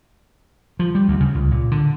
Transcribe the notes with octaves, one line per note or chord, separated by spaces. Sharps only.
F3
G3
D2
C#3
C#2
A#2
D3